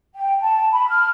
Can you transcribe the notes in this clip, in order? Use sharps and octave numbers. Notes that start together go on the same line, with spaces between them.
G5
A5
B5
F6